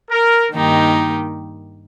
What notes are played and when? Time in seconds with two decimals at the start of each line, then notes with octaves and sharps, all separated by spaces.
0.11 A#4
0.53 G2 D#3 A#3 D#4 G4